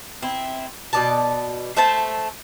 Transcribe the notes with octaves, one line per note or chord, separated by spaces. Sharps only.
C4 E4
B2 D5 A5
A3 C5 E5 A5